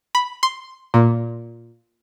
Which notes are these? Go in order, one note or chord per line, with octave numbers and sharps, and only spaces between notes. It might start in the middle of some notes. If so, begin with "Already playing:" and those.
B5
C6
A#2